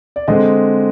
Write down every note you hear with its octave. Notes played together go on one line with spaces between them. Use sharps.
D5
D3 G#3 C4 D#5